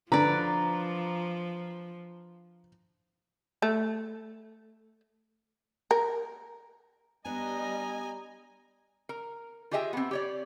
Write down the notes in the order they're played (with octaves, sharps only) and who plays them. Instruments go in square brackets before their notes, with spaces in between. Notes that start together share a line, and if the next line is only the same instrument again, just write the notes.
[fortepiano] D3 [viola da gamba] F3 [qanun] B4 D5 [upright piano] A#5
[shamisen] A3
A#4
[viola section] G3 D#5 [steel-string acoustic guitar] B3 D4 [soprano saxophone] G#5 [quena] A#5
[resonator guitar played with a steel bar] A#4
F4 G4 G#4 D#5 E5 G5
B3 C4
G4 C#5 D5